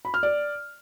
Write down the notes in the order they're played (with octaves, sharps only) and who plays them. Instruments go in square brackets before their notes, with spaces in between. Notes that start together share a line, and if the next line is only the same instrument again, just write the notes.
[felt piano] B5
F6
D5